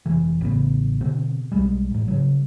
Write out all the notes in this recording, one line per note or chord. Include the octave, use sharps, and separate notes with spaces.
F1 C3 E3
A1 C#3 B3
B2 D3 C4
B1 F#2 G3 G#3
A1 G#2
C#3 F#3